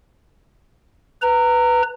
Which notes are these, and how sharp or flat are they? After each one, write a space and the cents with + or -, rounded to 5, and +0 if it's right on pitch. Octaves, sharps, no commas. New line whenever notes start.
B4 +0 A#5 -20